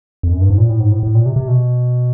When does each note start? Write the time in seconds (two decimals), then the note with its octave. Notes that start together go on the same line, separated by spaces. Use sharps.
0.23 F2
0.32 F#2
0.41 G2
0.50 G#2
0.58 A#2
0.69 A2
0.80 G#2
0.92 A2
1.03 A2
1.15 A#2
1.26 C3
1.36 C3
1.48 B2